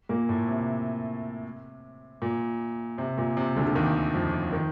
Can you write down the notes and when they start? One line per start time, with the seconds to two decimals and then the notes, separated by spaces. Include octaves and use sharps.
0.09 A#2 A#3
0.29 A2 A3
0.48 C3
2.22 A#2
2.98 C3
3.18 A#2
3.37 C3
3.56 D2 D3
3.67 D3
3.75 D#2 D#3
4.14 F2 F3
4.53 D#3